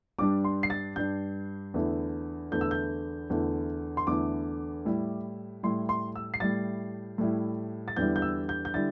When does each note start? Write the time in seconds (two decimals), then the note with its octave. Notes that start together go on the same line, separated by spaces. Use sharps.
0.19 G2 G3 D4 D6
0.44 C6
0.63 C7
0.70 A6
0.96 G2 G3 D4 G6
1.74 E2 D3 A3 E4
2.52 E2 D3 A3 E4 G6
2.61 E6
2.71 G6
3.30 E2 D3 A3 E4
3.97 C6
4.07 E2 D3 A3 E4 D6
4.85 A2 G3 E4
5.63 A2 G3 E4 C6
5.89 C6
6.16 E6
6.34 C7
6.40 A2 G3 E4 A6
7.18 A2 G3 E4
7.88 A6
7.96 E2 D3 G3 E4 G6
8.16 G6
8.22 E6
8.49 G6
8.65 G6
8.74 D3 G3 E4 A6